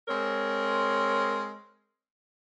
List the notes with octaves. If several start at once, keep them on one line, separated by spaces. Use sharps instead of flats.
G#3 C4 A#4 C#5